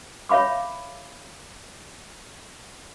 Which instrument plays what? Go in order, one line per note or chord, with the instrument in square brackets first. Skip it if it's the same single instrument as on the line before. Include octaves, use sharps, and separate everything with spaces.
[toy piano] C#5 E5 F5 B5 D6